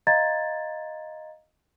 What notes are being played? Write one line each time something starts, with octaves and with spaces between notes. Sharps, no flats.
D#5 F5 A#5 C6 G#6 A6